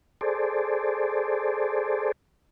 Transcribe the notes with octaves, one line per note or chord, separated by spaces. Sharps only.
G#4 A4 C5 D5